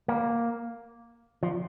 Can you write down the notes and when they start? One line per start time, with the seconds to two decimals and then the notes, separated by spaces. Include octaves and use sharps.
0.08 A#3
1.43 F3